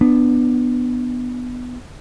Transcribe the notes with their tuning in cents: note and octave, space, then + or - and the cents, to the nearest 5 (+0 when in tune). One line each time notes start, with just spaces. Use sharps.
B3 +0 D4 +15